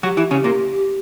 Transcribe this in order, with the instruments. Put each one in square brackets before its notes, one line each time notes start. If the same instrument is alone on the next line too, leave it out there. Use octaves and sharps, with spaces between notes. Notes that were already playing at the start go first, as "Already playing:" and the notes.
[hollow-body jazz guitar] F#3 F#4 [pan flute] G4
[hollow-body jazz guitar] E3 E4
C#3 C#4
A#2 A#3